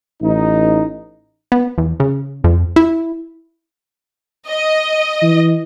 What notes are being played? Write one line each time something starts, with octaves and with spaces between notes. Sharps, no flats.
A1 D#4
B3
E2
C#3
F2
E4
D#5
E3